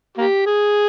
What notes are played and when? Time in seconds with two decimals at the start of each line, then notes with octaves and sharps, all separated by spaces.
0.18 A#3 G4
0.46 G#4